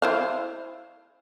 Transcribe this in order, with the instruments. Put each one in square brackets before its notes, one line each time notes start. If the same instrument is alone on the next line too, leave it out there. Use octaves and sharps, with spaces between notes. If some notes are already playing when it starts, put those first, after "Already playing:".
[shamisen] E4 C5 F5